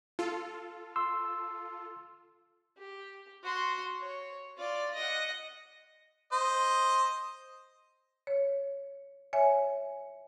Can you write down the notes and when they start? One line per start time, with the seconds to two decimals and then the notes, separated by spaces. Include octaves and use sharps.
0.19 F4 A4
0.96 C6 E6
2.77 G4
3.43 F#4 C6
3.99 C#5
4.57 F4 D5
4.95 D#5 F#5
6.32 C5 D#5
8.27 C#5
9.33 C#5 E5 G#5